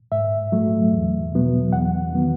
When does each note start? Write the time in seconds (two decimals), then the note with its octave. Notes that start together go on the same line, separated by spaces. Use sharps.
0.12 G#2 E5
0.52 F#3 A3
0.92 E2
1.32 B2 F#3 B3
1.73 E2 F#5
2.13 D#3 F#3 B3